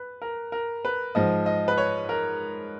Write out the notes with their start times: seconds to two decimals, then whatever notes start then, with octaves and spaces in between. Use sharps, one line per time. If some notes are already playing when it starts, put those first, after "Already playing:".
Already playing: B4
0.22 A#4
0.52 A#4
0.85 B4
1.15 G#2 F3 D#5
1.46 D#5
1.68 B4
1.78 C#5
2.09 A#4